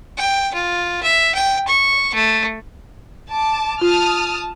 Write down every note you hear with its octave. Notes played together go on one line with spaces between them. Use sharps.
G5
F4
E5
G5
C#6
A3
A5 D6
F4 A5 D#6 F6